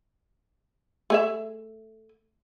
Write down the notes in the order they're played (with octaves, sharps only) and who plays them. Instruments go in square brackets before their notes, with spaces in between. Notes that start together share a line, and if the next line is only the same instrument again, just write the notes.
[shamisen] A3 G#4 E5